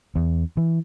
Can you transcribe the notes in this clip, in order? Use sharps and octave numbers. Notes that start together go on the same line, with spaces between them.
E2
E3